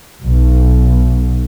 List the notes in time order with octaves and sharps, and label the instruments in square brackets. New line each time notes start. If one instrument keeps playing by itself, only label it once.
[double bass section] B1